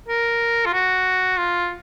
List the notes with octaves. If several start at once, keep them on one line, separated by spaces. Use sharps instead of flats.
A#4
F4
F#4
F4